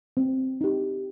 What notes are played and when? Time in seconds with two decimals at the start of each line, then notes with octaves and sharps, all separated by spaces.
0.17 C4
0.61 D#4 G4